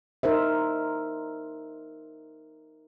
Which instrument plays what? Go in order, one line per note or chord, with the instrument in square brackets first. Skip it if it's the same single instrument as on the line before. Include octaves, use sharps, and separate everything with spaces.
[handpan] D#4 A#4 C5 E5